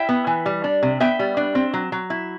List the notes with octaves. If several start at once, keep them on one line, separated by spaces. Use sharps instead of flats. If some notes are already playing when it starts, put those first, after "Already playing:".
Already playing: E4 E5 G5
B3
E3
G3
D4
C3
B3 E5 G5
G3
D4
C4
F#3
F#3
E4